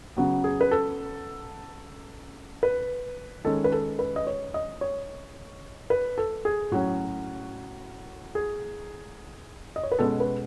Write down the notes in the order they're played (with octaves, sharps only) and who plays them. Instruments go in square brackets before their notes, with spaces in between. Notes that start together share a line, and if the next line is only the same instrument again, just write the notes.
[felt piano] C#3 F#3 B3 F#4
G#4
B4
A4
B4
D#3 G#3 C#4 A4
B4
A4
B4
D#5
C#5
D#5
C#5
B4
A4
G#4
A2 F#3 C#4 F#4
G#4
D#5
C#5
B4
B2 G#3 C#4 A4
B4